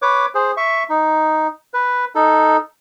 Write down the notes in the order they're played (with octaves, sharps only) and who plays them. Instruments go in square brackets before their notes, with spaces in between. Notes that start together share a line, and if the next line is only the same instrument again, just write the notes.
[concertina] B4 C#5 D6
G#4 C5
E5 C#6
D#4
B4
D#4 A4